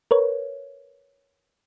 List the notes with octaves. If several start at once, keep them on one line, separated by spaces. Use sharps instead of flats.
A#4 B4 C#5